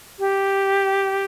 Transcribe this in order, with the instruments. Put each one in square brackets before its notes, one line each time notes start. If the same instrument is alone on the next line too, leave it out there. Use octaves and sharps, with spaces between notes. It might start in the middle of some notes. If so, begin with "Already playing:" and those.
[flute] G4